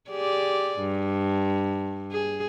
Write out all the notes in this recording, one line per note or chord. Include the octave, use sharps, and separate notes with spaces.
G4 G#4 D5
G2
G#4